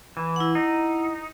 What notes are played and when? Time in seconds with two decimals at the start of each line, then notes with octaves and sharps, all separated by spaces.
0.17 E3
0.36 E4 F#5
0.55 D#4